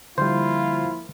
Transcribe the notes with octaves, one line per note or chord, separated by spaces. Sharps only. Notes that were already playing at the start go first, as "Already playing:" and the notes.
D3 F3 G3 A#3 E4 F4 C5